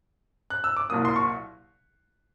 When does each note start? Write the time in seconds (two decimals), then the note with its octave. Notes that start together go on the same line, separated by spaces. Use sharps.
0.50 F#6
0.64 E6
0.77 D6
0.90 C2 A#2 F#3 A#3 D#6
1.05 C6
1.16 C#6